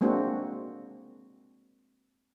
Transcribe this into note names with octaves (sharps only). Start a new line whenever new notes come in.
G#3 A#3 C4 D4 F#4